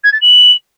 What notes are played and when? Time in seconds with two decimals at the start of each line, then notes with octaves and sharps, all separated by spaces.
0.04 G#6
0.13 A6
0.21 F#7